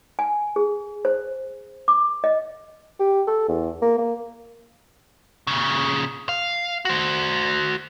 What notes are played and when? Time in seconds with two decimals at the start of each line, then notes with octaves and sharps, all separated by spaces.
0.19 G#5
0.56 G#4
1.05 C5
1.88 D6
2.24 D#5
3.00 G4
3.27 A4
3.48 E2
3.82 A#3
3.98 A#3
5.47 A#2 C#3
6.29 F5
6.85 F#4 C5